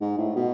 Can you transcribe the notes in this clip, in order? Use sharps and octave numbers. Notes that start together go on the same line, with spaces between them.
G#2
A2
B2